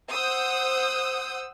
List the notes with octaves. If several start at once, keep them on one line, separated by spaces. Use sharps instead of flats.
C5 F#5 D#6 E6 G6